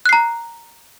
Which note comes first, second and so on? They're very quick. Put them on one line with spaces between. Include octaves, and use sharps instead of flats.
F#6 C7 A#5